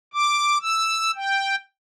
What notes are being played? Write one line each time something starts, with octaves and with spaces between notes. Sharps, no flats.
D6
E6
G5